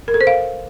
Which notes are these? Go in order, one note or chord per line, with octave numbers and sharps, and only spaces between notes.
A#4
A4
C5
F5